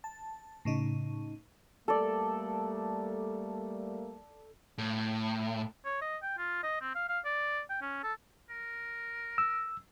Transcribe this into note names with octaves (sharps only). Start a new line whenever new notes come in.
A5
A2 C#3 D#4
G3 A3 A#3 A4 D5
A2
C#5
D#5
G5
F4
D#5
C4
F5
F5
D5
G5
C#4
A4
A#4
E6